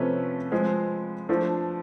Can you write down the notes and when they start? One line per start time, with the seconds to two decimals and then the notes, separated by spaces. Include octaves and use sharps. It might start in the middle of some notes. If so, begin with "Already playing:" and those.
Already playing: C3 F3 A3 C#4 B4
0.51 F3 G#3 C4
1.29 F3 A3 D4